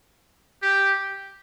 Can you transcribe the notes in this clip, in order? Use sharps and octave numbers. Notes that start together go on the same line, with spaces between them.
G4